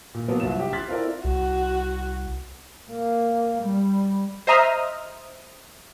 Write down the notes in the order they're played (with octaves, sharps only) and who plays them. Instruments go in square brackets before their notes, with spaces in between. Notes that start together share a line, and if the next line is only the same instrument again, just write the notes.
[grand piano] A#2
F3 F#3 A#3 B3
C2 G2 F#3 F4 E7
G4
C6 F6 F#6 G#6 A6 B6
C4 E4 F4 A4 A#4 D5
[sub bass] C2 [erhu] F#4
[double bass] A#3
G3
[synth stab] C5 D#5 E5 A#5 D#6 F6